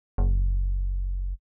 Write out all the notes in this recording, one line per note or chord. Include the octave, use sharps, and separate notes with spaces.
F#1